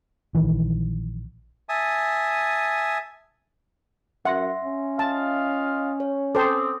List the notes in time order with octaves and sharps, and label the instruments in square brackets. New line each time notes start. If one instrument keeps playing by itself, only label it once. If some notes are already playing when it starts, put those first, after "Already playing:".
[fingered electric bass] A#1 D#3 E3
[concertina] E5 G#5 A5 D#6
[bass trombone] F#2 [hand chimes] E5 C6 A#6 [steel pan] F#5
[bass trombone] C#4
[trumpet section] F4 D#5 F5 [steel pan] A5
[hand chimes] C#5
[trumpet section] C4 [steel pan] A4 C5 [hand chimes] D6 D#6